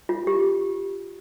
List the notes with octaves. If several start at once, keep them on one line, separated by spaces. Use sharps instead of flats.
F4
G4